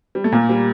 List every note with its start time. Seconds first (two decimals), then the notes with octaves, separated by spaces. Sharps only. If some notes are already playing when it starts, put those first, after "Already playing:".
0.15 G3
0.24 A3
0.32 A#2 A#3
0.49 G3